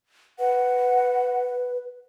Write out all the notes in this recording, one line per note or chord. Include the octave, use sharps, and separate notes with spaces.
B4 F#5